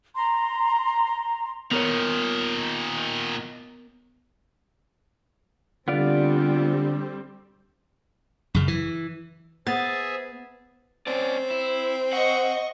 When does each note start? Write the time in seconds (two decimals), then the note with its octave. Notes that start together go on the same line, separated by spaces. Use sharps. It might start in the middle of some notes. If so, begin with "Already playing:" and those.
0.15 A#5 C6
1.71 A#2 D#3 B3 A#4 C#5
5.88 D3 G3 B3 C4 F4 D5
8.54 F#2 C#3
8.68 E3
9.67 B3 G#4 C5 E5 A6
11.07 C4 C#4 D5
11.51 E4
12.13 D#5 F#5 C#6